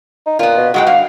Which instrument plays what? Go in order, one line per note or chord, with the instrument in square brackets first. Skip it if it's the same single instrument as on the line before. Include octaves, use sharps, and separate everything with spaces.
[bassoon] D#4
[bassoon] A#2 [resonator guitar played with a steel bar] B3 F4
[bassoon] B2
[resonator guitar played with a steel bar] G#2 G#3 G5 [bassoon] F#4
[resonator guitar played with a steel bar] G2 F5